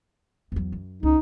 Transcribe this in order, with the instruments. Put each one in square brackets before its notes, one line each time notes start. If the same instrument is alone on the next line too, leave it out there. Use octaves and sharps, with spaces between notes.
[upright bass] E2 F#3
F#2
[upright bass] C#2 [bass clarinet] D#4